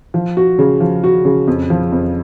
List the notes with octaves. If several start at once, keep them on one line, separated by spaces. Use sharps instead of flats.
F3
F#4
C#3
F3
F#4
C#3
F2
F3
F2